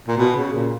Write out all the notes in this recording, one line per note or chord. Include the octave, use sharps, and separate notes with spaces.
A#2
B2
C#3
A#2